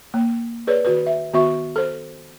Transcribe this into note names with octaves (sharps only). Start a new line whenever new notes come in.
A#3
G#4 B4 C#5 D5
D#3 F#4 B4
E5
D#3 B3 F#4 E5 C#6
A4 C5